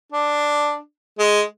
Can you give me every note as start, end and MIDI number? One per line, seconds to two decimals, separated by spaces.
0.12 0.76 62
1.19 1.42 56